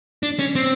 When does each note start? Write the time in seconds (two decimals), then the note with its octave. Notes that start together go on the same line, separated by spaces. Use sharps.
0.23 D4
0.39 C#4
0.56 C4